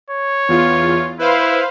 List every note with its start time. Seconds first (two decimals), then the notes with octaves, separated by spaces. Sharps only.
0.10 C#5
0.48 E2 F4
1.19 E4 B4 C5 F5